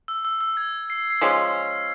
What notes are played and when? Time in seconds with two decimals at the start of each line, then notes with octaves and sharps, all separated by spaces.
0.08 E6
0.25 E6
0.41 E6
0.57 G#6
0.90 C7
1.10 C7
1.21 F3 G#3 C#4 B6